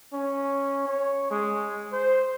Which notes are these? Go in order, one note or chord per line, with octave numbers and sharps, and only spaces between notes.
C#4
C#5
G#3
C5